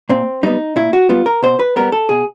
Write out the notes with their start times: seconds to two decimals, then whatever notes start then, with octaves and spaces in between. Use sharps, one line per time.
0.09 A#2 C4
0.43 G3 B3 D#4
0.76 A#2 E4
0.93 F#4
1.09 G3 B3 F4
1.26 A#4
1.43 B2 C5
1.59 B4
1.76 G3 B3 A#4
1.92 A4
2.09 B2 G#4